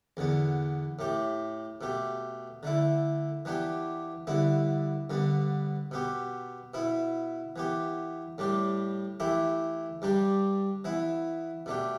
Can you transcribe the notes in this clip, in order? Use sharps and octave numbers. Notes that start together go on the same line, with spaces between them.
E2 D3 B3
A2 A3 G4
B2 A3 G4
D3 A3 E4
E3 B3 D4 G4
G2 D3 B3 E4
G2 D3 B3
B2 B3 G4
B2 B3 E4
E3 B3 G4
A2 G3 D4 G4
E3 A3 E4 G4
G2 G3 D4 G4
E3 B3 E4
B2 A3 D4 G4